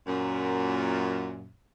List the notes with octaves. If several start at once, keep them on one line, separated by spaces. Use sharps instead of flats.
F#2 A#2